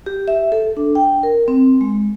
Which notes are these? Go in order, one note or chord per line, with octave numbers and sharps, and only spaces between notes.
G4
E5
A4
D4
G5
A#4
C4
G#3